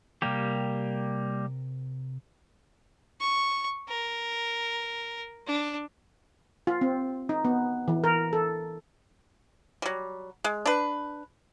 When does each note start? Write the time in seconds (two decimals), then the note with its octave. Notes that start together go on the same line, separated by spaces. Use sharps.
0.22 C3 G3 A#3 G4 A#4
3.20 C#6
3.89 A#4
5.47 D4
6.67 F4
6.81 C4
7.29 D#4
7.45 B3
7.88 E3
8.04 A#4
8.33 A4
9.82 F#3 G3
10.44 G#3
10.66 D4 B4